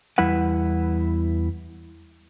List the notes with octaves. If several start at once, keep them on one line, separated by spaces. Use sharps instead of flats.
E2 G3 E4 B4 F#5